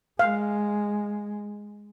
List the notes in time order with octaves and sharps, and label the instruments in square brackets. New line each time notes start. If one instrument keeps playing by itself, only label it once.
[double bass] G#3 [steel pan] F5